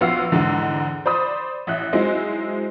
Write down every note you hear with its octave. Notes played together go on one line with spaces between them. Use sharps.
A#1 B3 F#4 F5 E6 C7
E2 G#2 D3
C5 D5 B5 D#6
A1 E5 F#6
F#3 G#3 C4 D#4 E4